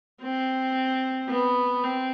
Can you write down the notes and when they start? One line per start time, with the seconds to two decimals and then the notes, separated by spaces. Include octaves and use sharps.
0.22 C4
1.29 B3
1.83 C4